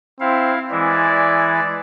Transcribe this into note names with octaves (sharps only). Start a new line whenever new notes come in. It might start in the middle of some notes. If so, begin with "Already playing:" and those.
C4 E4 F5
E3 G#3 E4 D5